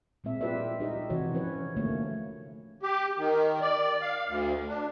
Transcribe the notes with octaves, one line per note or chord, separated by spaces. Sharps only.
A#2 G#3 C4 E5
F4 G4 B4 D5 E5
D#4 G4 D#5
C3 E3 F#4 C#5
F3 C#4 B4 C#5
D3 A3 A#3 C#5
G4
D#3
D5
F5
D2
D4